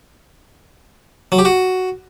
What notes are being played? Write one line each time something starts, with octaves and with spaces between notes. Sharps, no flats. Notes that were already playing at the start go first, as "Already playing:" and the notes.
F#3
G4
F#4